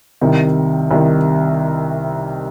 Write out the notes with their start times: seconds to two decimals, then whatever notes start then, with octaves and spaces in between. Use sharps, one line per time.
0.21 C2 C3 D#3
0.91 C2 C3 D#3